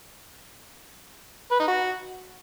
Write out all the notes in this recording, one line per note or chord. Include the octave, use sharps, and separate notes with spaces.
B4
D#4
F#4